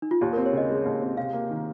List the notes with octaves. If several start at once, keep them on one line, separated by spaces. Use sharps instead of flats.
D#4
F4
D#2 G4
C4 A#4
C#5
C#3 D#5
G#3
D#2
C4
C3 F5
A#3
D#3